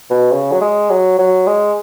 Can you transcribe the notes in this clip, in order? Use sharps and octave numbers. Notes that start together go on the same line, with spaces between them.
B2
C#3
F#3
G#3
F#3
F#3
G#3